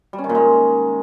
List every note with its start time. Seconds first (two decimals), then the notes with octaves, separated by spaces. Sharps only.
0.13 G3
0.19 C#4
0.24 D#3
0.29 A#2
0.35 G#3